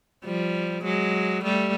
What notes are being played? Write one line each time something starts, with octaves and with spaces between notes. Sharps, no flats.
F3 G3
F#3 G#3
G3 A3